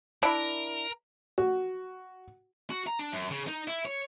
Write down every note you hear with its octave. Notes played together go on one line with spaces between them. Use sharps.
D4 E4 A#4
F#4
F#4
A#5
D4
F#2
C#3
D#4
E4
C#5